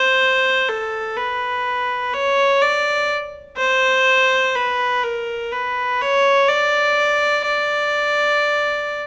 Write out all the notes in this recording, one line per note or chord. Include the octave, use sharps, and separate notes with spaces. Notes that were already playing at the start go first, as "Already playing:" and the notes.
Already playing: C5
A4
B4
C#5
D5
C5
B4
A#4
B4
C#5
D5
D5